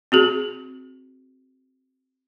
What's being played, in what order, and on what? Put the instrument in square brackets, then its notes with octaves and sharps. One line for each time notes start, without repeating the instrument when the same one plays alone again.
[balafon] C4 F#4 G#4